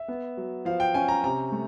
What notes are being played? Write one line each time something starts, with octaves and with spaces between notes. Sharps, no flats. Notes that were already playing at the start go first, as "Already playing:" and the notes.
Already playing: E5
B3
F#3
F3 F5
G5
C#4 G#5
A#5
C3 A#5
A3